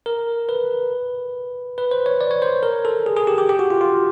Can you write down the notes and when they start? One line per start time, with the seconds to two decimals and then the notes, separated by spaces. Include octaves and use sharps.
0.06 A#4
0.49 B4
1.78 B4
1.91 C5
2.06 C#5
2.21 D5
2.31 C#5
2.42 C5
2.63 A#4
2.85 A4
3.06 G#4
3.16 G#4
3.27 G4
3.38 G4
3.49 G4
3.59 F#4
3.70 F4
3.81 F4